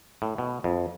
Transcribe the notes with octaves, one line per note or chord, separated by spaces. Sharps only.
A2
B2
F2